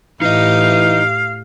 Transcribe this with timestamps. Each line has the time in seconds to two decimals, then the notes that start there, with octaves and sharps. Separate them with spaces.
0.22 A2 E3 D#4 G4 D#5 F5